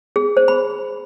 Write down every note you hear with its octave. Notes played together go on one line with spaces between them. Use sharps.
G#4
C5
B5